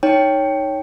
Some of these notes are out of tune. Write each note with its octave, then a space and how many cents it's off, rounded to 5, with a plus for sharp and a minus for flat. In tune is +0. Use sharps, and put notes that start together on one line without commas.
D#4 +0 C#5 +0 G5 +0